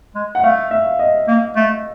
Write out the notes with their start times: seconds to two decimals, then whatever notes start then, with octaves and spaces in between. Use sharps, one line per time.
0.15 G#3
0.35 F#5
0.43 A3 F5
0.71 E5
0.99 D#5
1.28 A#3
1.56 A3